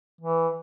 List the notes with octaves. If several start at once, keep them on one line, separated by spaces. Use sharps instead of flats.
E3